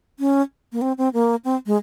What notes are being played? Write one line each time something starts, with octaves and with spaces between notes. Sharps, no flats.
C#4
A#3
C4
C4
A#3
C4
G#3